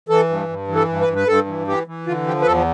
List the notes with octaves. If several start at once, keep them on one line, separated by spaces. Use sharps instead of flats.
E3 A4
G2
G2
E3
A4
G2
B4
G2
B4
G2 A4
E3
E3 G4
E3
D3 F4
F3 G4
B4
E2 A4